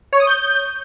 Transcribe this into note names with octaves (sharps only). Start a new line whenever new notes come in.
C#5
D#6
G6